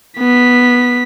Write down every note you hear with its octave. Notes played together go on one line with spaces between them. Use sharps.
B3 B6